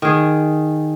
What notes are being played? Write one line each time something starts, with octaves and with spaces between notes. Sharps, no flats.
D#3 G#4